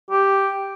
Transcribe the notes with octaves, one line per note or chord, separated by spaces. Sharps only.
G4